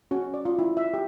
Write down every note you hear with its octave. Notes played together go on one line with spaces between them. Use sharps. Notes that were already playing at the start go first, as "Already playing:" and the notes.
C#4 F#4
D5
F4
E4
E5
G4